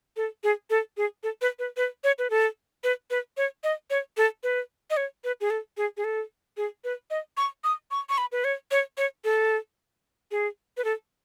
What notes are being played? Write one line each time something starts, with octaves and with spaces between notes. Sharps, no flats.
A4
G#4
A4
G#4
A4
B4
B4
B4
C#5
B4
A4
B4
B4
C#5
D#5
C#5
A4
B4
D#5
C#5
B4
G#4
A4
G#4
G#4
A4
G#4
B4
D#5
C#6
D#6
C#6
C#6
B5
B4
C#5
C#5
C#5
A4
G#4
B4
A4